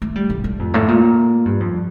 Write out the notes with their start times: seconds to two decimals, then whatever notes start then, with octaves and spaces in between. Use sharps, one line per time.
0.02 A3
0.16 G3
0.30 A2
0.44 A2
0.59 F2
0.74 A2
0.88 A#2
1.45 G2
1.60 F2